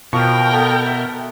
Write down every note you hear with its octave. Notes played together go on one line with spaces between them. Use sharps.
B2 F3 A#4 G5 C#6
B3 A4
E5